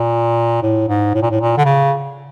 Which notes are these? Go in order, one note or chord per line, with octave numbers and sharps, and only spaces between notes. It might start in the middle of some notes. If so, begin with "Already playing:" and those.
Already playing: A#2
A2
G#2
A2
A#2
A2
A#2
D3
C#3